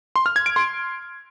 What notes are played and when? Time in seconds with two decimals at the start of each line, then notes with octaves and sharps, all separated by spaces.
0.16 C6
0.26 F6
0.36 G#6
0.46 D7
0.56 C6